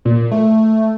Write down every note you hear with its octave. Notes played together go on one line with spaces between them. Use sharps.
A#2
A3